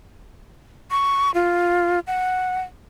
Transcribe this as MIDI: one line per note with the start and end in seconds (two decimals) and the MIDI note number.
0.91 1.31 85
1.34 2.00 65
2.07 2.62 78